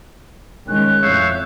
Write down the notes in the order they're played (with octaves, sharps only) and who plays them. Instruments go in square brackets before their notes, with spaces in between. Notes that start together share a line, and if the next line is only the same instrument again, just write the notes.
[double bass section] D#3 G#3 C#4 [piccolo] F#6
[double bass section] F2 A2 [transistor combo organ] C#5 E5 [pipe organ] F5 G6